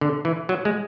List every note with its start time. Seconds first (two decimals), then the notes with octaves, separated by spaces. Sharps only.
0.01 D3
0.25 E3
0.49 F#3
0.65 G#3